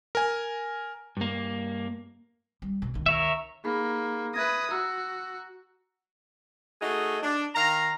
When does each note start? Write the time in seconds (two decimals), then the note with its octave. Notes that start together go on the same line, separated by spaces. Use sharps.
0.15 A#4 G#5
1.17 G2 A#3
2.62 G3
2.82 B2
2.94 C#2 D#3
3.06 A#4 C#5 E5
3.64 A#3 D#4 G#4 B5
4.34 B4 E5 D#6 G#6 A#6
4.71 F#4 A#5 E6
6.81 A3 D#4 F#4 G#4
7.22 D4
7.55 D#3 F5 A#5